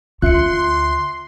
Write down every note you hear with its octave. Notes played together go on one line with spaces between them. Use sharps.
D2 F4 E5 C6 F#6 C#7